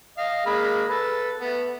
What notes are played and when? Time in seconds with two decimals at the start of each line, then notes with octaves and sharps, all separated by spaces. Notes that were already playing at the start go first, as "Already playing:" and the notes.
0.18 D#5 F5
0.46 G#3 A#3 B5
0.89 A4 B4
1.40 A3 B3